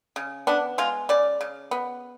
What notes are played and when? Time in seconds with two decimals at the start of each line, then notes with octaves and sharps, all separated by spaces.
0.16 C#3
0.47 B3 D4
0.78 G#3 F4
1.09 C#3 D5
1.41 C#3
1.71 B3